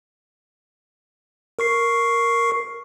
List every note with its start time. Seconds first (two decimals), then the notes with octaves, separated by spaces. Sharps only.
1.59 A#4 C#6 C7